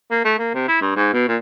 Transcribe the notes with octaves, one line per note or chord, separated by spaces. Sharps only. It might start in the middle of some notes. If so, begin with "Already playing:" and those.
A#3
A3
A#3
C3
E4
G2
G#2
B2
A#2